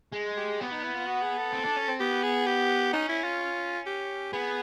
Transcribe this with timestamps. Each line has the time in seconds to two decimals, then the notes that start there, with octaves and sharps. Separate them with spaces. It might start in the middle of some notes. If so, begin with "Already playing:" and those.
0.13 G#3
0.37 G4
0.61 B3
0.71 D#4
0.83 E4
0.95 F4
1.07 F#4
1.22 G#4
1.38 A4
1.53 C4
1.65 D4
1.77 C#4
1.89 C4
2.00 B3 G4
2.23 G#4
2.46 G4
2.93 C#4 D#4
3.09 E4
3.24 F4
3.86 G4
4.33 B3 G#4